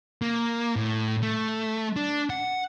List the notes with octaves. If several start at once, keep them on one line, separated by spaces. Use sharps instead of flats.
A#3
A2
A3
D4
F#5